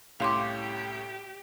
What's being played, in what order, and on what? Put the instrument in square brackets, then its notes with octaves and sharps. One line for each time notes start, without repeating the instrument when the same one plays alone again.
[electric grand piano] C2 A2 C#4 [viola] G4 [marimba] F5 C6 D6